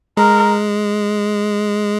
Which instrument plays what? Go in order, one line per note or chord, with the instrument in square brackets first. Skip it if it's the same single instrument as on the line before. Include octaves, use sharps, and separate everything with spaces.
[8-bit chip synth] G#3 [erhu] A#4